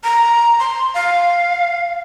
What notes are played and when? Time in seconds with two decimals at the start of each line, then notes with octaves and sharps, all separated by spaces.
0.04 A#5
0.59 C6
0.94 F5